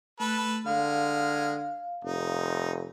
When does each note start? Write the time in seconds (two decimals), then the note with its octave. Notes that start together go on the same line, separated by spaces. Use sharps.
0.20 A3 A4 B4
0.66 D3 G#3 F5 F6
2.04 F1 D#4